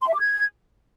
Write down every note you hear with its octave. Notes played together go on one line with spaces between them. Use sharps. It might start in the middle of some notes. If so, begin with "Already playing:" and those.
C6
E5
D6
G#6